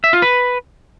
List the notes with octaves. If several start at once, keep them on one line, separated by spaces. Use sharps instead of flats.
E5
F4
B4